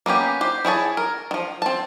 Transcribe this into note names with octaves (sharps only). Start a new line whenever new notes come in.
A#3 B3 C#4 G4
G4 C5
E4 G#4 C#5 A5
A#4
D#3 F3
C4 A5